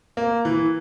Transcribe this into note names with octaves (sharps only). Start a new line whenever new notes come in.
A#3
E3